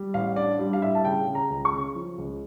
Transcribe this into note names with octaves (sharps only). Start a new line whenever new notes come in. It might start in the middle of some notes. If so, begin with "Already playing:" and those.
Already playing: G3
A1 F5
D4 D5
G3
F5
A2 E5
A5
C#3 G5
C#3
A#5
C#2
C#6
C#3
F3
C#2